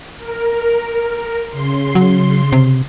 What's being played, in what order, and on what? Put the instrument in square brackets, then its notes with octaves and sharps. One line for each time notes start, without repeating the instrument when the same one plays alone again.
[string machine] A#4
C#3 C6
[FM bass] F#3
C3